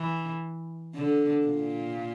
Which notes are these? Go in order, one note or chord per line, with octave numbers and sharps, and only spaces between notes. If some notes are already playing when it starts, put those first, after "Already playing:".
Already playing: E3
D3
A#2